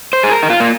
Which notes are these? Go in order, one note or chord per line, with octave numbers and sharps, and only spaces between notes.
C5
G#4
A#4
D#4
F4
A#3